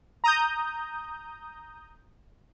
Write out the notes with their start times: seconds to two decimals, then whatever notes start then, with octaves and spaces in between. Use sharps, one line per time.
0.24 A#5 D#6 G6